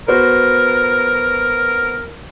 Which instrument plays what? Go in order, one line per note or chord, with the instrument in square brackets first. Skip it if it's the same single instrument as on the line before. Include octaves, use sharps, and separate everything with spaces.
[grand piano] B3 F#4 C5 [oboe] A#4